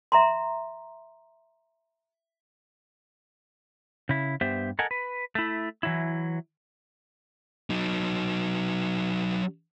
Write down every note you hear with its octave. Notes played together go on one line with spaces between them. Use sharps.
E5 A#5 C6
C#3 E4
G2 B3 G4 C5 E5
A4 A#4 D#5 F#5 G#5
B4
A3 E4
E3 F#3 E4
F#3 D#4